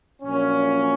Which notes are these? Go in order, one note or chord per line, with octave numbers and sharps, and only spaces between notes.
A#1 A#2 F#3 A#3 C#4